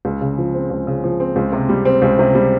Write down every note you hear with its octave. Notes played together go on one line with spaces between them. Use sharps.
C#2
C#3
F3
C4
C#2
C#3
F3
C4
C#2
C3
G3
C4
C#2
C3
G3